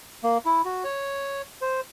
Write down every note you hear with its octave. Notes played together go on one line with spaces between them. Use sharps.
A#3
E4
F#4
C#5
C5